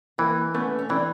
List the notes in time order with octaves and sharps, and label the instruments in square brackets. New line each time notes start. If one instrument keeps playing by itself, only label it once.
[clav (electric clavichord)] E3 [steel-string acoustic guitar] A#3 C4
[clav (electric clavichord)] A3 [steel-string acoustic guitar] B3 C#4
[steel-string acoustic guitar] C#4
[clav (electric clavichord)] E3 [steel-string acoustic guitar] C4 D4